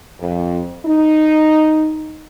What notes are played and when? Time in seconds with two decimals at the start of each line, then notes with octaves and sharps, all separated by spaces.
0.20 F2
0.85 D#4